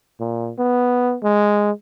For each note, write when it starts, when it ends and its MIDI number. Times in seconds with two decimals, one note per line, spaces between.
0.20 0.52 46
0.59 1.17 59
1.23 1.71 56